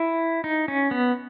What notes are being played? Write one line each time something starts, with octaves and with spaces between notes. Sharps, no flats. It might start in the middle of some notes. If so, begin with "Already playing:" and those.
Already playing: E4
D#4
C#4
B3